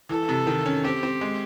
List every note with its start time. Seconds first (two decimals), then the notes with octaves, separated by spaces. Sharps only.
0.09 E3 A4
0.29 C3
0.47 D#3
0.66 C#4
0.84 C4 G4
1.03 C4
1.21 G#3